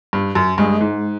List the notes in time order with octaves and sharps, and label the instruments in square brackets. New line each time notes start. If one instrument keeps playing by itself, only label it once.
[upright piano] G2
F#2
[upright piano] G2 [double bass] G#3
[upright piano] G#2